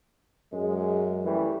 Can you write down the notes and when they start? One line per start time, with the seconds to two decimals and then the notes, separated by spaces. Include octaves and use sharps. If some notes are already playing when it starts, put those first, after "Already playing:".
0.53 F#2 G#3
1.24 E3 G3 A3